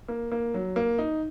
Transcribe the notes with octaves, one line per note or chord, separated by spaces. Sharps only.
A#3
A#3
F#3
A#3
D#4